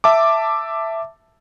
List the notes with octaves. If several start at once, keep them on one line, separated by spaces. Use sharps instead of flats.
E5 A5 D6